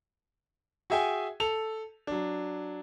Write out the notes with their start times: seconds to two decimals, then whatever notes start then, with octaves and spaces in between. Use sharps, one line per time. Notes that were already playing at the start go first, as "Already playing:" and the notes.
0.90 F#4 G#4 E5 G5 G#5
1.40 A4 F7
2.07 F#3 D4